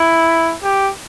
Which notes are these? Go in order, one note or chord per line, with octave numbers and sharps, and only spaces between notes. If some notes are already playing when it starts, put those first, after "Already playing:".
Already playing: E4
G4